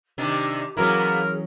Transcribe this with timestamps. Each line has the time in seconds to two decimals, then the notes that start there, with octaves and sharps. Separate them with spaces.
0.18 C3 D#3 D4 G4
0.77 E3 F#3 A#3 B3 C#4 E4 G#4 A#4